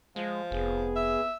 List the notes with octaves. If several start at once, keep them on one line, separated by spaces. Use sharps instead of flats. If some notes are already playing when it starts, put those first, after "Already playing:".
F3 G#3
F1 B3 G#4
E5